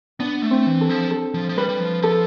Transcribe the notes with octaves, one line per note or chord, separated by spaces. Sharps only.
B3 D4
A3
C4
E3
A4
F3
A4
F3
F3
G3 B4
G3
F3
F3 A4